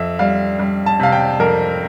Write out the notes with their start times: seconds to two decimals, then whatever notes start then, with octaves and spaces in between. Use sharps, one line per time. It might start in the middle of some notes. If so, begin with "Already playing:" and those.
Already playing: F2 E5
0.19 G3 F5
0.59 G3
0.86 A5
1.00 C3 F5
1.12 G5
1.40 F2 A#4